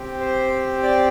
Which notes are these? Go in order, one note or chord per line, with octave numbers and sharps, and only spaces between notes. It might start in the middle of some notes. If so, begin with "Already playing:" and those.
Already playing: C4 G4
C5
D5